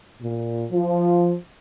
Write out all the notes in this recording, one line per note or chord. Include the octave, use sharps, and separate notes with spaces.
A#2
F3